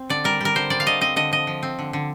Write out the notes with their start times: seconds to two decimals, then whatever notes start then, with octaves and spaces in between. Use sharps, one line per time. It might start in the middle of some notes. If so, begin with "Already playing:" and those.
Already playing: C4
0.09 D3 D5
0.24 G3 A#4
0.41 G3 A#4
0.55 D3 C5
0.70 G3 D5
0.80 F5
0.86 D3 D#5
1.01 C4 D#5
1.16 D3 D#5
1.32 F3 D#5
1.47 F3
1.63 C4
1.79 D3
1.93 D3